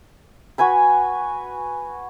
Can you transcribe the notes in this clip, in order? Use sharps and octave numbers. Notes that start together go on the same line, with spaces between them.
F#4 B4 G#5 B5